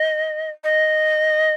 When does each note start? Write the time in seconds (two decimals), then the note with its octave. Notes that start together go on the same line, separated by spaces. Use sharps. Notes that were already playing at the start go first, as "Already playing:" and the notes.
Already playing: D#5
0.64 D#5